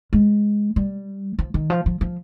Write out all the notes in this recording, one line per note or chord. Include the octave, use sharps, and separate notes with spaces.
G#3
G3
F3
D#3
F3
F3
F3